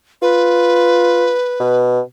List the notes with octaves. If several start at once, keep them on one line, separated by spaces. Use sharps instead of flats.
F4 B4
B2